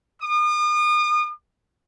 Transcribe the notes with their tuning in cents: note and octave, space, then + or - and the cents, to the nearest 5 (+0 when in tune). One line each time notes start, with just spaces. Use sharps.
D#6 -40